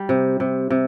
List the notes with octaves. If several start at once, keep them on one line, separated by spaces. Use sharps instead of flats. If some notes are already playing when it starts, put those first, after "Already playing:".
Already playing: G3
C3
C3
C3